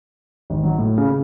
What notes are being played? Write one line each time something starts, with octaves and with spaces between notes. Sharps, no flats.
G#1
F#3
A2
C#3
C#3